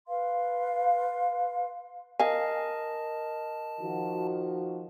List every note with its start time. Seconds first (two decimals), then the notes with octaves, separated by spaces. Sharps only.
0.08 B4 F5 C6
2.20 A#4 D#5 F5 G#5 A5
3.81 D#3 F3 F#4